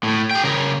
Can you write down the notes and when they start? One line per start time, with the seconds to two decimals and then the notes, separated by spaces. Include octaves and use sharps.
0.04 A2
0.31 G#4 G5
0.44 C#3 A#4